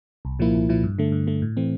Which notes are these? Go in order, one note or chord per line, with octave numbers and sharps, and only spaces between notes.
C2
A#2 F3 A#3 E4
C2
A#2 F3 A#3 E4
G2
D3 A3
G2
D3 A3
A2
E3 A3 C4